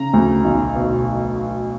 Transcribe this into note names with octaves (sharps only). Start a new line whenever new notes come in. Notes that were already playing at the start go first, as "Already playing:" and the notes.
Already playing: C#3 A#5
D2
B1
B2